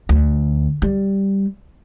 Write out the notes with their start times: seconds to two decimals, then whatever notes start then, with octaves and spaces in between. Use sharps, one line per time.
0.09 D2
0.82 G3